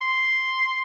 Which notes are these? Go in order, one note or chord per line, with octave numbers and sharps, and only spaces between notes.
C6